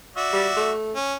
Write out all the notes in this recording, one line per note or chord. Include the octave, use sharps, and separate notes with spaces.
F#4 D5 E5
G3
A3
C#4